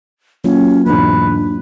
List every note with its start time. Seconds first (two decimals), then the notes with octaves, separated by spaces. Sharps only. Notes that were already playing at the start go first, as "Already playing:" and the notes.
0.44 F#3 A#3 C#4 F4
0.86 E2 G#2 B2 D4 B4